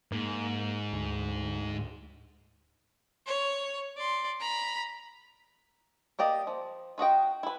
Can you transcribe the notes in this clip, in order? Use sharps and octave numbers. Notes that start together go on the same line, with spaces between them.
G#2 A#3
D2
C#5
D5 C6
A#5 B5
A#3 G4 D5 D#5
F3
F4 F#4 D#5 G5
E4 B4